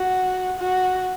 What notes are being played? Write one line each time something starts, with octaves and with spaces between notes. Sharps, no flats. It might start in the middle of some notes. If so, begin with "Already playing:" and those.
Already playing: F#4
F#4